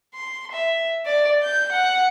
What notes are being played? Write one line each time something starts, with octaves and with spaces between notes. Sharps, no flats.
C6
E5
D5
G6
F#5